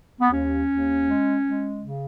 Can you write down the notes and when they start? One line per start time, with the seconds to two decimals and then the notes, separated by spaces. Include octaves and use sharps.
0.21 B3
0.31 D#2 C#4
0.69 D#2
1.07 G#3
1.44 G#3
1.82 C#3